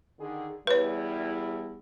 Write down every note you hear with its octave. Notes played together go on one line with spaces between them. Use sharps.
D3 D#3 G#4
E2 G3 E4 B4 C#5